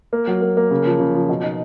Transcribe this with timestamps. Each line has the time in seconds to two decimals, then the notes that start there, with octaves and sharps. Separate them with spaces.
0.13 A#3
0.27 F#3
0.42 A#3
0.57 A#3
0.71 C#3
0.86 F3
1.00 C#3
1.15 F3
1.29 B2
1.44 D#4